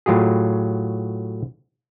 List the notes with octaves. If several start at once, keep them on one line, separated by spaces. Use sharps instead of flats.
A2 F#3 F4 G4 G#4